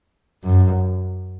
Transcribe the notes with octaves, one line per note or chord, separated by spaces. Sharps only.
F#2